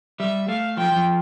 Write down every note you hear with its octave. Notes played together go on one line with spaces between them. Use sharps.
G3 E5
A3 F5
F3 G5
F3